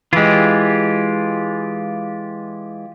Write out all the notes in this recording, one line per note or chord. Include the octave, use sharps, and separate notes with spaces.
E3 G#3 F4 G4